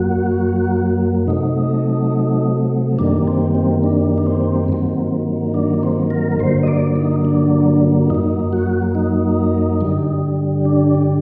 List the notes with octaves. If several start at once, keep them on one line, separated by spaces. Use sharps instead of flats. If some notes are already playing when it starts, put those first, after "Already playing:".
Already playing: F#2 F#3 A#3 F#4
C3 F#3 A3 D#4
F#2 D#3 G3 A#3 D4
C4
C4
D4
D4
C4
G2 D#3 F#3 A#3
D4
C4
A#4
A#4
G2 D3 F#3 A#3 C5
D#5
D5
D#4
D4
F#2 F#3 A#3 D#4
F#4
D#4
G2 D3 G3
D4